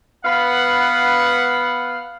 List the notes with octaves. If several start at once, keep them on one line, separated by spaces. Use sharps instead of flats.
B3 B4 F5 F#5